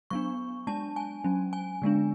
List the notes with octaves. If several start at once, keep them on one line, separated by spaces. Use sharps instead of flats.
F#3 B3 D4 C#6
G#3 D4 A5
G#5
F#3 C#4
G#5
D3 G#3 B3 D4